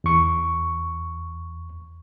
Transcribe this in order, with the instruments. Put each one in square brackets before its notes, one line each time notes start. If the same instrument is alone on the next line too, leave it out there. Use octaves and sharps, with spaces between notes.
[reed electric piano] E2 C#6